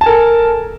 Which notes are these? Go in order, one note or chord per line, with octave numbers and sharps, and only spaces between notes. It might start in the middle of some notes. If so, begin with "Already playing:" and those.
A4 A#4 G#5 A5